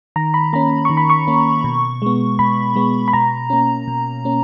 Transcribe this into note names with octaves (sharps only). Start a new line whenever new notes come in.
D#3 A#5
B5
A#3 C#4 A#5
D#3 C#6
B5
C#6
A#3 C#4
B2
G#3 B3
B2 B5
G#3 B3
B5
B2 A#5
A#3 C#4
B2
A#3 C#4